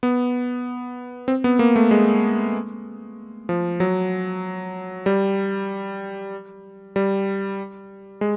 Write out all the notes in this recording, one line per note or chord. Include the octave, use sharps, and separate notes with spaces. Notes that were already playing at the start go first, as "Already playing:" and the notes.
B3
C4
B3
A#3
A3
G#3
F3
F#3
G3
G3
G#3